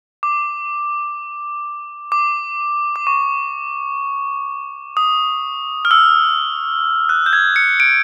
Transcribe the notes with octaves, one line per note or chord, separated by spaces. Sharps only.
D6
D6
D6
C#6
D#6
F6
E6
F#6
G6
G#6
C#7
D7